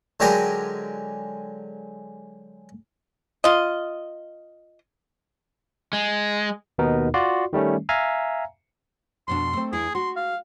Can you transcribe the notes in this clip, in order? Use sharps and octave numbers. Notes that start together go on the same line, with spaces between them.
D3 F#3 G#3 G4 A#4 G#5
F4 D#5
G#3
D#2 B2 B3 D#4 A#4
F4 F#4 D5 C6
D#3 G3 A3 C#4
E5 F5 G#5 A#5
F2 B2 D4 C6
A3 C4
E2 E4 G#4
G#3 F#4 C6
F5